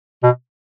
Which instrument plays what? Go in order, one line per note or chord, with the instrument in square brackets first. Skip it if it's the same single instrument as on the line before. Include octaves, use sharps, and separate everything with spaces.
[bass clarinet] B2